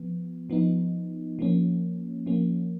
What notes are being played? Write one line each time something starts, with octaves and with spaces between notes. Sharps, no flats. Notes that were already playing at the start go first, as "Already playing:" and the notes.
Already playing: F3 B3
F3 B3 D#4
F3 A#3 C#4
F3 A#3 C#4